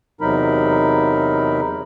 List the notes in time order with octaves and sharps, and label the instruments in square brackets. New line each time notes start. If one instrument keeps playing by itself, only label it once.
[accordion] E2 C3 F#3 D#4 A#4 B5